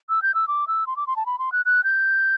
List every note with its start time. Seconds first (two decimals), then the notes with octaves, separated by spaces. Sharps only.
0.09 E6
0.22 G6
0.35 E6
0.48 D6
0.68 E6
0.87 C6
0.97 D6
1.07 C6
1.16 A5
1.26 B5
1.39 C6
1.52 F#6
1.66 F#6
1.84 G6